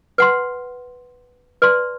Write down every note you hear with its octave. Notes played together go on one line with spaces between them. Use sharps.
B4 F#5 C6
B4 D5 A5 C6